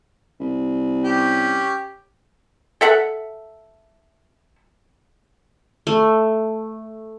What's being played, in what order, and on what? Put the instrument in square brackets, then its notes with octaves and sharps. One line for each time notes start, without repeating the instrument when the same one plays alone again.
[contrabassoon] C2
[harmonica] C#4 G4
[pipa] A4 E5 F#5
[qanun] A3